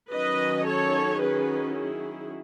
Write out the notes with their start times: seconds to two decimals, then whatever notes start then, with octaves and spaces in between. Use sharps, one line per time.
0.11 D#3 F#3 C#4 B4 D#5
0.66 A4 C#5
1.19 G#4 B4
1.74 E4 G#4